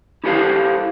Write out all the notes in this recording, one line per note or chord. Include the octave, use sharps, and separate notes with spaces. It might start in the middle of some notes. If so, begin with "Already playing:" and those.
E4 G4 A4 C5 F5